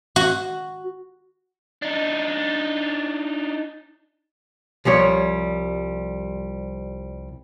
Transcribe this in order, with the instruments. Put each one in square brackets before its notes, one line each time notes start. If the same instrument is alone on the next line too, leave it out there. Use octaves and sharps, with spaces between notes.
[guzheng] F#4
[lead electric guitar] D4 D#4
[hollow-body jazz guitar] C2 F3 G3 C#5